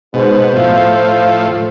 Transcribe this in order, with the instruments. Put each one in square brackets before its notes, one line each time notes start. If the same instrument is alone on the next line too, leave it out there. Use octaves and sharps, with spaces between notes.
[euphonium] G#2 [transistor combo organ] B2 [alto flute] C5
[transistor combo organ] A2 F3 [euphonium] F4